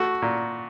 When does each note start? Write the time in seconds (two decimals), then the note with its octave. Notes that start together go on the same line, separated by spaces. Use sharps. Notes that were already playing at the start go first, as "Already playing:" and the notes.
Already playing: A3 F#4
0.22 A#2